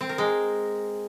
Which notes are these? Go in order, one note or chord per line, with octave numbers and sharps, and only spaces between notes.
C4
A#4
G#3